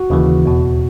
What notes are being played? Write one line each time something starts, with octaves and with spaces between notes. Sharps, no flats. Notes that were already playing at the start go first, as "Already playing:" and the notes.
Already playing: F#4
D#2 C#3 E3
E2 B2